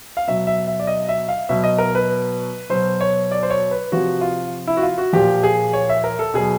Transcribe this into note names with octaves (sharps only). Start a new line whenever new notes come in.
F5
B2 F#3 E5
E5
E5
D5
D#5
E5
F5
B2 F#3 E5
D#5
A#4
B4
B2 F#3 C5
C#5
D5
C5
C#5
B4
C3 F3 F#4
F4
E4
F#4
F4
F#4
A#2 F3 G4
G#4
C#5
E5
A#4
A4
B2 F#3 G#4